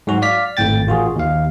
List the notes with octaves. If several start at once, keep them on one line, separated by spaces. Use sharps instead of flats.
G#2 F#3 F#4
D5 F5 F6 B6
G#1 F2 A2 G5 A6
A1 F4 F#4 G#4
D#2 F5